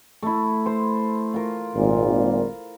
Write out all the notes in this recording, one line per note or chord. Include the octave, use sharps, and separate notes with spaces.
A3 E4
C5
F4 A#4
G#1 A#2